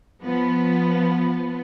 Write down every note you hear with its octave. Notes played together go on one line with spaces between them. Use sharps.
F3 B3